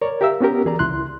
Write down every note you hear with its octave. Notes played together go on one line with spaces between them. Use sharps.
A#4 C#5 D5
G4 A#4 E5 F5 E6
B3 C#4 F#4 G4 A#4
C2 E3 G#4 D5 A#5
C#2 E4 C6 F#6